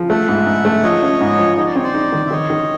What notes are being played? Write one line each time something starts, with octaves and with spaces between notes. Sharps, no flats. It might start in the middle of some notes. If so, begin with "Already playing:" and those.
Already playing: F3
A3 E5 F#5
G#2
G#2
A3
F3 C#5 D#5
C#4
G#2
F3
D#4 D#5
D5
C4 C#5
C5 D5
D#4
D#3
E5
D#3 C#5 D#5
D#3